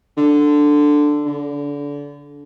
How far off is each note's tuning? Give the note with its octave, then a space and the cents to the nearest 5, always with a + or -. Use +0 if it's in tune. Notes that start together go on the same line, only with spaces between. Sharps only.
D3 +5
D3 -30